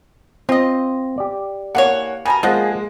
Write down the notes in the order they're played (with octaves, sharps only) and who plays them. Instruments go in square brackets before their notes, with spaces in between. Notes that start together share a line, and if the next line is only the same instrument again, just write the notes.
[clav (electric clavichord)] C4 [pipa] F4 D#5
[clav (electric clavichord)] G4 D5
[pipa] D3 E3 C#5 [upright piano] A#3 F#5
[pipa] B2 C#4 A#4 [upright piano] G#5 A5 [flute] B5
[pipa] F3 D#5 F#5 [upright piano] G#3 A#3 [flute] G#4